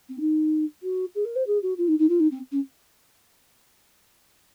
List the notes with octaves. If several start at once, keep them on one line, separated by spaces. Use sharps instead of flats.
C4
D#4
F#4
G#4
A#4
C5
G#4
F#4
F4
D#4
D#4
F4
D#4
C4
C#4